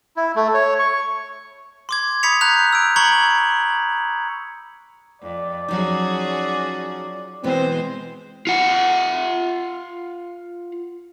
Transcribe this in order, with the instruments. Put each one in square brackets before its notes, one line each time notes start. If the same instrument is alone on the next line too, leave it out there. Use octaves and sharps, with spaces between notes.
[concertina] E4
A3
C#5
C#6
[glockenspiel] C6 D6 G#6
B5 D#6 G#6 B6 C#7 F7
A#5 F#6 G6 F7
E6 D7
A#5 B5 C#6 G#6 C#7 F#7
[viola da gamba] F2 [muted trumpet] D5
[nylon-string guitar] F3 F#3 D#4 [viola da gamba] C#4 F#4 G#4
[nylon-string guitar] B2 E3 B3 [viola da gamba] G#3 C5 [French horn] C4
[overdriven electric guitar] F4 F#5